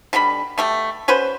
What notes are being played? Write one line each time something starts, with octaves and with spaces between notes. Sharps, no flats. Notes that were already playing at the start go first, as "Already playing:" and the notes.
B2 D3 G3 B5
B2 A3 G4
C#4 F#4 B4 C5